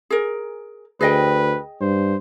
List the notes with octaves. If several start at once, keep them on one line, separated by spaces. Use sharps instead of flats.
G#4 A#4
D2 G#4 B4 D#5 G5
G2 C5